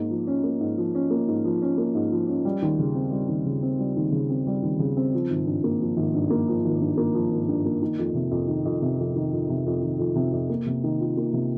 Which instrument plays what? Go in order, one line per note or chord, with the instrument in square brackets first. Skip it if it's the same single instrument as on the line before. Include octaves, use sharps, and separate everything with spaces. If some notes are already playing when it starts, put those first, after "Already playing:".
Already playing: [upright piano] G#2 A#3
F3
C#4
A#3
G#2
F3
C#4
A#3
G#2
F3
C#4
A#3
G#2
F3
C#4
G3
D#2
C#3
C4
G3
D#2
C#3
C4
G3
D#2
C#3
C4
G3
D#2
C#3
C4
F3
G#1
G2
A#3
F3
G#1
G2
A#3
F3
G#1
G2
A#3
F3
G#1
G2
A#3
D#3
F2
C3
F2
D#3
F2
C3
F2
D#3
F2
C3
F2
D#3
F2
C3
F2
A#3
C3
D#3
F4
A#3
C3